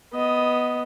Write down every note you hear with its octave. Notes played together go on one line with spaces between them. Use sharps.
B3 D#5